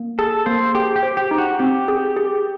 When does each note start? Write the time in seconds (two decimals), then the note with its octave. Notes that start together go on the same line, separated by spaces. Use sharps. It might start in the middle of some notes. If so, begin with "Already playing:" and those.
Already playing: A#3
0.19 G#4 A4
0.46 A#3 C5
0.75 G4 G#4
0.96 G4
1.03 C5
1.17 G4
1.31 D#4
1.38 F#4
1.59 C4 G4
1.88 G#4
2.17 G#4